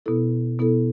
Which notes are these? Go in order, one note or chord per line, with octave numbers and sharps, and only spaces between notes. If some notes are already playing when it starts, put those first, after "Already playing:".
B2 B3 E4 A4
B2 B3 E4 A4